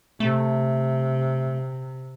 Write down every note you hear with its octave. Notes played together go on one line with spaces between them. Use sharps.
C3 A3